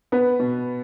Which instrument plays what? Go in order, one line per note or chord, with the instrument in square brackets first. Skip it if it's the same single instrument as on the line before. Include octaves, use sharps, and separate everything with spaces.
[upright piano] B3 [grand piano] B4
[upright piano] B2